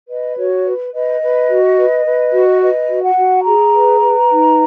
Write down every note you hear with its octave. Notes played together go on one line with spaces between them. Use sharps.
B4 D#5
F#4 C#5
B4
B4 D#5
B4
F#4
B4
B4
F#4
B4 D#5
F#4
F#5
F#4
G#4 A#5
B4
B4
D#4